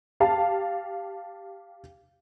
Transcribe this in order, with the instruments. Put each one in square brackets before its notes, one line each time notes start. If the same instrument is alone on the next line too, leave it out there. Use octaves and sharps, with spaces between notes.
[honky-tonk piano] G4 F5 A5